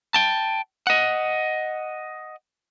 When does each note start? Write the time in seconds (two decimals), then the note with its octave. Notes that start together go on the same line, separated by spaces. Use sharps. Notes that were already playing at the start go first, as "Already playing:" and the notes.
0.14 G5 A5
0.87 D#5 F#5